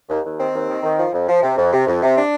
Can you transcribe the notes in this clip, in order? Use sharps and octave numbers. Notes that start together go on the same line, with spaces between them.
D#2
D#2
D#3 C4
D#2
D#3
D#3
F3
F2
F3
C3
F2
C3
F2
C3
D4